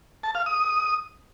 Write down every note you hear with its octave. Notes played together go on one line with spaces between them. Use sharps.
A5
F5
D#6